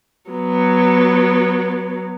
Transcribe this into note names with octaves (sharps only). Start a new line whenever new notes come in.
F#3 B3